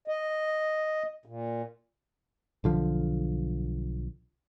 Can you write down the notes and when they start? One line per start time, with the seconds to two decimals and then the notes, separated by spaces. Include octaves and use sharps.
0.08 D#5
1.26 A#2
2.64 B1 D3 F3